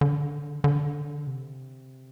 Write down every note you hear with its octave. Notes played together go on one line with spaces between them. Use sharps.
D3
D3
C3